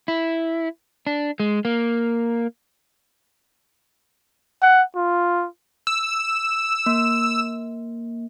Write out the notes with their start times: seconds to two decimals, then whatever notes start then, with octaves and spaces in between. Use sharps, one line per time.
0.08 E4
1.07 D4
1.40 G#3
1.65 A#3
4.62 F#5
4.96 F4
5.87 E6
6.86 A#3